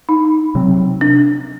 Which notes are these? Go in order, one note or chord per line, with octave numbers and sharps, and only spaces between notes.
D#4
C3 F#3 C4
D4